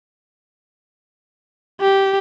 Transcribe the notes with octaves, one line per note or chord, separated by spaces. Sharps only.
G4